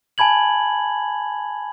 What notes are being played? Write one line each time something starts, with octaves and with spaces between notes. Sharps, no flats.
G#5 A5 B5 G#6 F#7